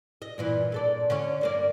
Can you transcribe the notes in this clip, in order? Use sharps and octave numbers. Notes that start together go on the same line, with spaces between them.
D#5
G2 A#2 E3
A#2 A4 D5
D3 C#4 C#5
G2 A#3 D5